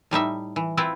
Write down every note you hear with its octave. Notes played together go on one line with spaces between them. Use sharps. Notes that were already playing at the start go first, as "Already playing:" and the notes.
A2 G3 D#4 E5
E3
C4 E4 F4 B4